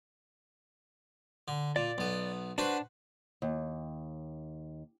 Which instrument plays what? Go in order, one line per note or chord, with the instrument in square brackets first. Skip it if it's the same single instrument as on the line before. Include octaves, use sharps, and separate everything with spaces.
[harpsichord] D3
[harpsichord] A#2 [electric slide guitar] D5
[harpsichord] B1 B3
[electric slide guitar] D4 [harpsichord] F#4 B4 C5
[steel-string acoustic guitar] D#2